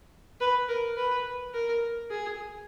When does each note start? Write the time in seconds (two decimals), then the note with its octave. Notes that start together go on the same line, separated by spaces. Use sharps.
0.40 B4
0.68 A#4
0.97 B4
1.54 A#4
2.11 G#4